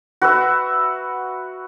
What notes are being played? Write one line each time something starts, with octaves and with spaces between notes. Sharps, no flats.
F#4 B4 E5